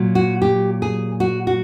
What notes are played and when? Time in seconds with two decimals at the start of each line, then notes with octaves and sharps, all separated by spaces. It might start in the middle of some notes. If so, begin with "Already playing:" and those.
Already playing: A#2 F#3
0.15 F#4
0.42 G4
0.82 G#4
1.20 F#4
1.47 F#4